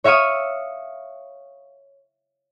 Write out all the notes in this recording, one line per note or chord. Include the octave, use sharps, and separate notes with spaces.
C#5 E5 F5 C#6 D#6